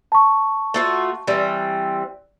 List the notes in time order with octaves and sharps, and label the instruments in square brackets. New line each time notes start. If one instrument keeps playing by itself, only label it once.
[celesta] A5 C#6
[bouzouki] A3 F4 F#4
E3 G3 C4